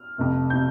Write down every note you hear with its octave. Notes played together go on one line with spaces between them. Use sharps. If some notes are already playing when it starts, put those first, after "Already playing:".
Already playing: F6
F1 F2 C3
C3 G6